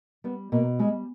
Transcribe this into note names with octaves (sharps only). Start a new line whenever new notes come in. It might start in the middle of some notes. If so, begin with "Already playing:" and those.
G3 B3
B2 A#3
G3 G#3